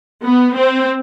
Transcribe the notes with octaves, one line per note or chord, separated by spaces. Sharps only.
B3
C4